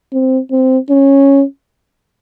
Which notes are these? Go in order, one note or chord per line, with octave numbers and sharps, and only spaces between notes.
C4
C4
C#4